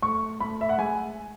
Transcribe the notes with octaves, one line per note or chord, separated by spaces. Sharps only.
A3 C#6
A3 B5
E5
F#5
G#3 G#5